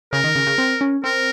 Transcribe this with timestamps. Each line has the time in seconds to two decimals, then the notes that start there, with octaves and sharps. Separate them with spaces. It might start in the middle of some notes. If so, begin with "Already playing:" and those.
0.13 C#3 A#4
0.24 D#3
0.35 C#3
0.47 C#3
0.58 C4
0.81 C#4
1.04 C4 A#4